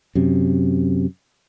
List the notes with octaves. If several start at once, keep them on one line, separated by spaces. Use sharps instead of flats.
F#2 C3